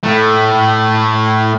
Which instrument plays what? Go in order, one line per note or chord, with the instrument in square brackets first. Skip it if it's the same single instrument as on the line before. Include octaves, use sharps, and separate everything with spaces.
[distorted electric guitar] A2 A3